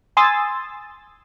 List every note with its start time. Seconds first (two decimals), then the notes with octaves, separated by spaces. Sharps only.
0.17 G#5 C6 D#6 E6 A6